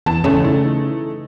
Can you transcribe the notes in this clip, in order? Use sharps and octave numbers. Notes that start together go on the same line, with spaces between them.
E2 A5
A1 C#3 A3 C#4
E3 A3 D#4